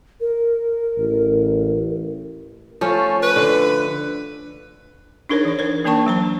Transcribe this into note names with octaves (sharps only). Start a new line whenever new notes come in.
A#4
A1
F3 A3 C#4
B4
D3
D4 D#4 G#4 A#4 C5 C#5
E3 C#5
A#4 C5
E3 A#3 D4 G5 A5 C#6
F#3 C5 A#5